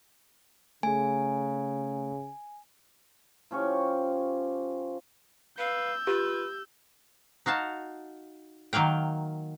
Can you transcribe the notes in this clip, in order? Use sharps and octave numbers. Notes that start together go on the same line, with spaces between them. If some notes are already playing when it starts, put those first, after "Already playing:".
C#3 A3 G#4 G#5
F3 C#4 G4 C#6
B4 F5 E6 G6
F4 G4 B4
D#4 F#4 F5 A5
D#3 F#3 A#3 F5 G5